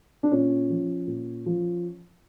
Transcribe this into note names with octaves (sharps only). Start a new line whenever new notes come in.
D4
A#2 C#4
F3
A#2
F3